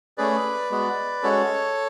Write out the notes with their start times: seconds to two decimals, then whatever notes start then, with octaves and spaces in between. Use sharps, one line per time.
0.18 A3 C#4 G#4 B4 D5
0.71 G#3 B3 F#4
1.23 G#3 C#4 F#4 A4 C#5